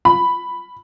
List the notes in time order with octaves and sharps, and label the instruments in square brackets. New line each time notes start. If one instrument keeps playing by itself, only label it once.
[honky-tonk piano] B5